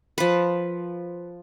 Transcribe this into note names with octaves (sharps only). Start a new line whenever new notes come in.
F3 B4